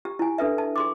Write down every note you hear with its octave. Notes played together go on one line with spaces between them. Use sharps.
G4
E4 G#5
D4 A4 B4 E5
A5
G#4 C6 D6